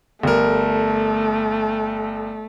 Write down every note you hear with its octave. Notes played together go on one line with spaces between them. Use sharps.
G1 A3 A#4